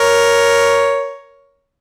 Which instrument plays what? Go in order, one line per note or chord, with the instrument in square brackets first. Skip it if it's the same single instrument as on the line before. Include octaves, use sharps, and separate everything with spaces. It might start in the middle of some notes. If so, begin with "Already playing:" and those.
Already playing: [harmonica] A#4 C#5